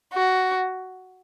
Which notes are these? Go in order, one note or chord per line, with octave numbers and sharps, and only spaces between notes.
F#4